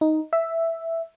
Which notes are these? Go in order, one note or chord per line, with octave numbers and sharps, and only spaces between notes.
D#4
E5